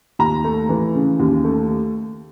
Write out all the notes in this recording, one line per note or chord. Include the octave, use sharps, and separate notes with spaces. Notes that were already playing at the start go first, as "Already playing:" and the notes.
D#2 A#5
A3
E3
C#3
D#2
A3